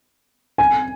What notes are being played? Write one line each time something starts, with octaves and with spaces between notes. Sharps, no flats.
G#5